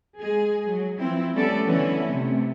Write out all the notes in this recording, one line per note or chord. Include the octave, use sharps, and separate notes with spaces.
G#3 G#4
F#3
E3 F3 C4 E4
G3 A3 B3 C#4 A4 D5
D3 E3 A3 B3 C#4 E4
C3 A3